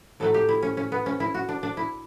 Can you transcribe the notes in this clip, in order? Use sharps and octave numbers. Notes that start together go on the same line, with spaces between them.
A2 F#3 A3 A4
G4
E4
C#4
C#4
B3
C#4
E4
F#4
D4
D4
E4